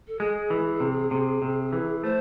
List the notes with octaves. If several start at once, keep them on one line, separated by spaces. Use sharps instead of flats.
A4
G#3 G#4
E3
C3
C3
C3
E3
A3 C5